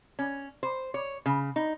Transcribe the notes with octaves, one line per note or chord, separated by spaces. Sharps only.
C#4
C5
C#5
C#3
D#4